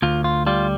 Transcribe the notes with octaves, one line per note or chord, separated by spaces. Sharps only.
D2 F4
F4
G3 F4